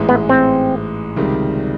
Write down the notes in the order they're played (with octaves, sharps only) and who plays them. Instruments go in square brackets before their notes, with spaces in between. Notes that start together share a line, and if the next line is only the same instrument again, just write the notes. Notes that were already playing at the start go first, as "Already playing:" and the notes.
Already playing: [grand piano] A1 G#2 E3 G#3
[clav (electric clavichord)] B3
C4
[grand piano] C#2 C3 D#3 G3